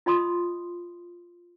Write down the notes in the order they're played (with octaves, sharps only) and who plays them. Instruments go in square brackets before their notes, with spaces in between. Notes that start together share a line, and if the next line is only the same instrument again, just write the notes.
[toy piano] F4 D#5 B5 C6 D#6